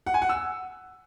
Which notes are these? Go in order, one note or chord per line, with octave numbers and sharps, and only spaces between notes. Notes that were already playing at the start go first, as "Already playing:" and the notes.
F#5
G#5
F#5
E6